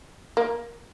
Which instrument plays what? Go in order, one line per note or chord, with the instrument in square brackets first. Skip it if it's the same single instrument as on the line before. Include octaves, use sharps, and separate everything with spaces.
[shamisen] A#3